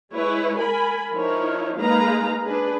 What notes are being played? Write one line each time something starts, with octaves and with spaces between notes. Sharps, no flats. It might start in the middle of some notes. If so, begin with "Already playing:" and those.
G#3 E4 B4 C#5
A#4 G#5 B5
F3 D#4 E4 A#4 C#5
G#3 A#3 D#4 B4 F5 A#5
D4 G#4 B4